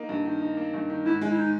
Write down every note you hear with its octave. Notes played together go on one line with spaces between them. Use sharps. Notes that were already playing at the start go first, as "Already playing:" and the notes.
Already playing: A#3 D#4
G2
D#3
D#4
A#3
G2
D#3
G#2 E4
G#3
E4
D#4